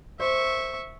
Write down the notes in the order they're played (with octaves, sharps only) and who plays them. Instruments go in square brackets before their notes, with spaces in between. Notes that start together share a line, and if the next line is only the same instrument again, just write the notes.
[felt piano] C5 [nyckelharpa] E5 C#6